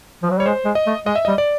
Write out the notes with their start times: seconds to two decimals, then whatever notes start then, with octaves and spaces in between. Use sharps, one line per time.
0.23 F3
0.30 F#3
0.38 G3 C#5
0.46 G#3 C5
0.65 G#3
0.75 D#5
0.87 A3
1.06 G#3 D#5
1.15 E5
1.25 G3 D#5
1.38 D5